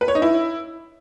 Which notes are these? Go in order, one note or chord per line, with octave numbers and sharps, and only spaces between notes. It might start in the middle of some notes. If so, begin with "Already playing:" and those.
B4
C#5
D#4
E4